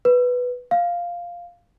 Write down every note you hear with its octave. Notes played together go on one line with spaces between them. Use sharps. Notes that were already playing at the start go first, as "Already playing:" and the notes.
B4
F5